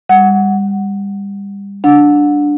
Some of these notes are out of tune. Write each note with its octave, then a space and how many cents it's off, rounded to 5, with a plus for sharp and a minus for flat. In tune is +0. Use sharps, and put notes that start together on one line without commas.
G3 +30 F#5 +0
D4 +0 F#5 -30